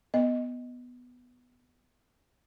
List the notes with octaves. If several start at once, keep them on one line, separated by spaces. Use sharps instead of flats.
B3 D#5